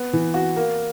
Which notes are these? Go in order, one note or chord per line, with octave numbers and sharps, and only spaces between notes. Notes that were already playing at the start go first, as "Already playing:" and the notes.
Already playing: B3
E3
F#4
A#3